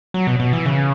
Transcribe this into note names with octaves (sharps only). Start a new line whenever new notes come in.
F#3
B2
B2
E3
C#3